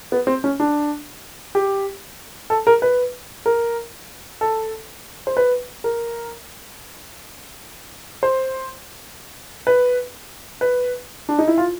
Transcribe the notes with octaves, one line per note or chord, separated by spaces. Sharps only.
B3
C4
C#4
D4
G4
A4
A#4
B4
A#4
A4
C5
B4
A#4
C5
B4
B4
D4
D#4
E4
F4